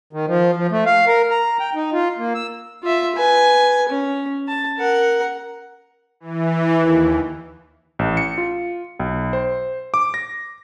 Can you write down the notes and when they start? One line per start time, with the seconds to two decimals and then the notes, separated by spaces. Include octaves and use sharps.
0.13 D#3
0.28 F3
0.56 F3
0.71 A3
0.86 F5
1.07 A#4
1.31 A#5
1.60 G5
1.75 D#4
1.93 F4
2.18 A#3
2.34 E6
2.83 F4 E5
3.15 B4 G#5
3.89 C#4
4.48 A5
4.78 A#4 F#5
6.20 E3
6.78 D#2
7.99 A1
8.17 C#7
8.38 F4
8.99 B1
9.33 C5
9.94 D6
10.14 A#6